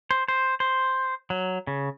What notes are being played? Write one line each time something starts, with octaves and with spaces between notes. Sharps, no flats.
C5
C5
C5
F#3
C#3